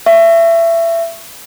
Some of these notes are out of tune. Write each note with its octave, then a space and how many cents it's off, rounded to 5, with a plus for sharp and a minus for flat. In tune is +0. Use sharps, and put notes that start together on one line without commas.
E5 +25 C#6 +0